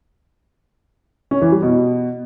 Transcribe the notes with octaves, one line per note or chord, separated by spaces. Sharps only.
C#4
E3
G3
B2